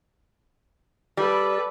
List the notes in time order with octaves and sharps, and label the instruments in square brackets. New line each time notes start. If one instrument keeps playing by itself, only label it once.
[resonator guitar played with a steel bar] G3 [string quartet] A4 B4 D5